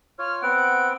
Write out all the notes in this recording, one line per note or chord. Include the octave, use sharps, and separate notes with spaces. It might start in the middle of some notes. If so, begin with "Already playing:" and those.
F4 C#5 F6
B3 C4 F#5 D7